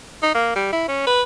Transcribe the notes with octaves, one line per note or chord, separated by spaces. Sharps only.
D#4
A#3
G3
E4
C#4
B4